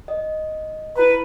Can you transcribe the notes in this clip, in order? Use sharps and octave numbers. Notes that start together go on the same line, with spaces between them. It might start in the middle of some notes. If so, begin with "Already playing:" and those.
D#5
E4 B4 A#5 B5